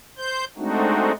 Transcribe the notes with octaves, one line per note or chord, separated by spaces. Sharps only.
C5 G6
G#3 A3 C4 D4 D#4 F#4